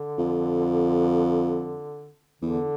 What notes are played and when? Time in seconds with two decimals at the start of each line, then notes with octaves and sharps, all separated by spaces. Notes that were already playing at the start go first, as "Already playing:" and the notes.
Already playing: D3
0.18 F2
2.42 E2 D3